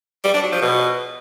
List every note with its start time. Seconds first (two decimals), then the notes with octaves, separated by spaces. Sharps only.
0.24 G3
0.34 D4
0.43 F#3
0.52 F3
0.61 B2